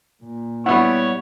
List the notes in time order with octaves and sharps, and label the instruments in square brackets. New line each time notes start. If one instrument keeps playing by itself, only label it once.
[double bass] A#2
[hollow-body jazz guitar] G3 F#5 [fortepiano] B3 E4 [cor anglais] C#5